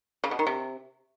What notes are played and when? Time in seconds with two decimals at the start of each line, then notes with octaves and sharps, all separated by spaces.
0.24 C#3
0.31 B2
0.39 D#3
0.47 C3